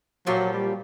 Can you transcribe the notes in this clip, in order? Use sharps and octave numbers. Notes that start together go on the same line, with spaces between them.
A#2 F3 F#3 G4
G3